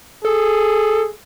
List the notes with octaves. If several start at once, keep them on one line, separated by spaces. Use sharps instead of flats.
G#4 A4